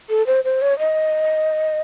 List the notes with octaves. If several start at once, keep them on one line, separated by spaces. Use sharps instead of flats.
A4
C5
C5
C#5
D#5